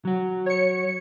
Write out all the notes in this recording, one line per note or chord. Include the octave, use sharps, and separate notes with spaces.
F#3 F#4
C#5 C#7